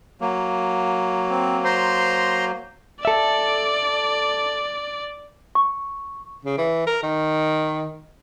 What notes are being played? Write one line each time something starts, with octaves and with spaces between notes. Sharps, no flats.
F#3 A#3
C4
C5 A#5 C6
A4 D5 E5
C#6
C#3
E3
A#4
D#3